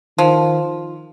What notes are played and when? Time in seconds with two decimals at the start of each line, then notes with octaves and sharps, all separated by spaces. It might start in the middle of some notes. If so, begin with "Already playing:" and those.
0.18 D#3 F3